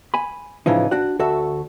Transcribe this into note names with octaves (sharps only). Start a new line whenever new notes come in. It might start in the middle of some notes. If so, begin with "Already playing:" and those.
G#5 B5
A2 C#3 E3 F3 D#4
D4 F#4 F#5
D2 F#4 A4 E5